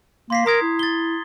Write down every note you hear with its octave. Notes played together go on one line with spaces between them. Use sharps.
A#3 C6 B6 C7
A#4 A#5 D#6 G#6
E4
A6 G7